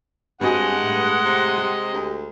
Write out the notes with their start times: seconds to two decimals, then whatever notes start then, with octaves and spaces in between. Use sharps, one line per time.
0.41 G2 G#3 C4 F#4 D#5 F#5 G#5
0.82 A2
1.25 C3
1.58 G4
1.93 D2